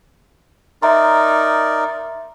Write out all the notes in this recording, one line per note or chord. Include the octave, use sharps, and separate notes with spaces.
D#4 A#4 D5 E5 A#5 C6